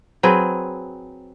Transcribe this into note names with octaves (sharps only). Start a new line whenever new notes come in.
F#3 C4 G#4 B4